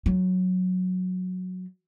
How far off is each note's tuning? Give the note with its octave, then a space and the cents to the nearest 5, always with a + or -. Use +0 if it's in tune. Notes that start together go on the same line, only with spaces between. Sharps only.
F#3 -10